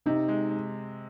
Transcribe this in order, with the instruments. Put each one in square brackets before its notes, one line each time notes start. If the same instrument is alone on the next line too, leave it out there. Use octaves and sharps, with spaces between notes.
[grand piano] C3 [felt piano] D#4
[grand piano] G#3
G#3